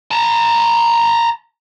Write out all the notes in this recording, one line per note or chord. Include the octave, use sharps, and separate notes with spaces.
A5 A#5